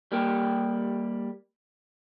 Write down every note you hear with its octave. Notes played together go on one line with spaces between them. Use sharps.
G3 A#3 G4